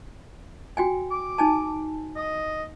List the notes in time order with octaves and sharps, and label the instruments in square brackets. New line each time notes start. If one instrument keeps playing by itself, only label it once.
[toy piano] F#4 G5 G#5
[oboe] D6
[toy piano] D#4 G#5 A5
[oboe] D#5